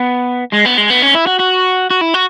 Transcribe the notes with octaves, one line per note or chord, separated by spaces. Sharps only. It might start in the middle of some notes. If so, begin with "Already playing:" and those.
Already playing: B3
G#3
B3
G#3
B3
C#4
E4
F#4
F#4
F#4
E4
F#4